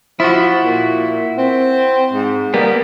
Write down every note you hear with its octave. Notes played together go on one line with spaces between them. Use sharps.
F3 E4 F#4
A#2
C4
G#2
G3 A#3 B3